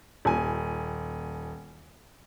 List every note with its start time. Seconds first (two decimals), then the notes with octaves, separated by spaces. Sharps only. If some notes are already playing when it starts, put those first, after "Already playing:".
0.25 D#1 G#5